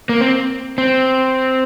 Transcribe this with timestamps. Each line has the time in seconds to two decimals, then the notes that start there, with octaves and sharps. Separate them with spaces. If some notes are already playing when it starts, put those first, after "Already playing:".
0.09 A#3
0.21 C4
0.78 C4